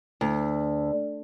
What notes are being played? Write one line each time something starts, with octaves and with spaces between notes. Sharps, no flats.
D2